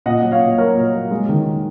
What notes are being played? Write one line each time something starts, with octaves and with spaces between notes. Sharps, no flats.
A#2 D#5 F#5
F#3
C#5 F5
A#2
F#3 A#4 C#5
A#2
F#3
G#3
D#3